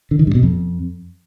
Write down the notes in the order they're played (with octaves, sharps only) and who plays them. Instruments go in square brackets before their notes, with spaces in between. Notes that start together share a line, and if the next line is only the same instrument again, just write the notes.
[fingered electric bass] D3
D#3
G2
B2
F2